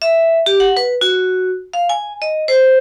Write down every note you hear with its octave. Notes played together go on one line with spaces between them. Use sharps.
E5
G4
F#5
B4
F#4
F5
G#5
D#5
C5